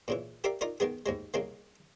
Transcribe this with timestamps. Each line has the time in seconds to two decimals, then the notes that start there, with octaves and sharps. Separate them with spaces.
0.08 A#2 C#3 E3
0.44 G4 A#4 D5 E5 F5
0.61 D#4 F4 A#4 D5
0.80 D#3 G#3 B3 G#4
1.06 D#2 G#2 G#3
1.34 C2 C#3 G#3 A#3